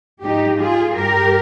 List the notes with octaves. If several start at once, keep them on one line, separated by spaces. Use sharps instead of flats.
G#2 F3 D#4 G4
F4 G#4
G2 G3 G4 A#4